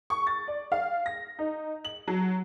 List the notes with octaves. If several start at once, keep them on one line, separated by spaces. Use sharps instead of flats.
C#6
A6
D5
F5
A#6
D#4
F#7
F#3